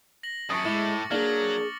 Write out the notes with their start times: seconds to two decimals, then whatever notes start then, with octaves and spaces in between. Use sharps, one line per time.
0.23 A#6 F#7
0.50 F#2 A5 C#6 D#6 A6 C#7
0.65 A2 G#3 E4 C#6 D6 A6
1.11 F#3 A#3 D4 G#4 F6 A#6 F#7